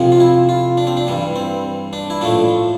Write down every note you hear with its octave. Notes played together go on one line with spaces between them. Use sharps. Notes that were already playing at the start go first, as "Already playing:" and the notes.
Already playing: F2 C3 F3
F4
E4
F4
D4
C4
D4
G2 E3 G3
C4
D4
E4
A2 F3 A3 D4